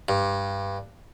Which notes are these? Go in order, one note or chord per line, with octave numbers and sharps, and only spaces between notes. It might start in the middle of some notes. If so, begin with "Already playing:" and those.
G2